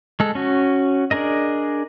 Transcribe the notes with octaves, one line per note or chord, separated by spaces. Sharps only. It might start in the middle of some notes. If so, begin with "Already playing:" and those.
G#3 A4
C#4 F#4
D4 G#4 A#4 D#5